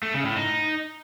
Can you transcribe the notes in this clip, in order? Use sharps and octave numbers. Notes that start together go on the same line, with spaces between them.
A3
C#3
A2
D#4